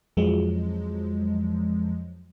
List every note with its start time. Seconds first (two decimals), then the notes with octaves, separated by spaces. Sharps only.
0.17 F2 F3 F#3 G#3